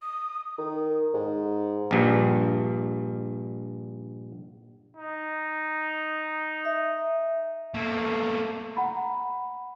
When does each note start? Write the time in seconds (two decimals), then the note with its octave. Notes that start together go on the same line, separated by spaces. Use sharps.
0.02 D#6
0.58 D#3
1.14 G#2
1.91 A#1 G2
4.97 D#4
6.65 E5
7.74 A3 A#3
8.77 F#5 A#5 B5